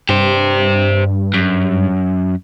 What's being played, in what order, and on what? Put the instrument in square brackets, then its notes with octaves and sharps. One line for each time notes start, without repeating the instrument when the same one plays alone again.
[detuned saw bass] G2 [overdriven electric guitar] G4 C5
[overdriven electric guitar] F#2